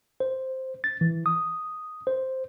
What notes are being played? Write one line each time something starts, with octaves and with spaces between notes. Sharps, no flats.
C5
A6
E3
D#6
C5